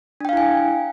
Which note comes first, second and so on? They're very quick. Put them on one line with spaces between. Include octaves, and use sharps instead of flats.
D4 G5 F5 E4 G#5